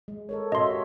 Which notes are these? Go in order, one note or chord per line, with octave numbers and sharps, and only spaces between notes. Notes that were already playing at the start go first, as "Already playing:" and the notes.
G#3
A4 A#4 C#5
F#4 D#5 E5 C6
G4 C#5